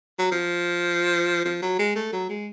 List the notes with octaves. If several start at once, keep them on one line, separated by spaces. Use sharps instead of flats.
F#3
F3
F3
F#3
G#3
A3
F#3
G#3